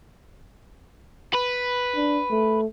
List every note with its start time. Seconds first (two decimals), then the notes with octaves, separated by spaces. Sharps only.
1.33 B4
1.96 D4
2.31 A3